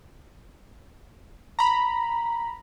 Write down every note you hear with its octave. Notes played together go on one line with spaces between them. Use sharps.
A#5 B5